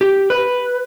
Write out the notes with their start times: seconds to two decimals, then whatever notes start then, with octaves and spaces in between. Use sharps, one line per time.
0.01 G4
0.30 B4